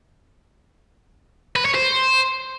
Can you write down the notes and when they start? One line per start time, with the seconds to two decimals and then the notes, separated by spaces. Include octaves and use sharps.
1.56 B4
1.65 C#5
1.75 C5